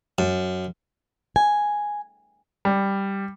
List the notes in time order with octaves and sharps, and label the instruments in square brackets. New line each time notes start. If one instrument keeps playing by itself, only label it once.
[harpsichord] F#2
[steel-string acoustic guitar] G#5
[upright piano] G3